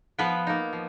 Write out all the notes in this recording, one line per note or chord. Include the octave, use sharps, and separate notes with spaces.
F3 B3 B4
A#3 D#4
F3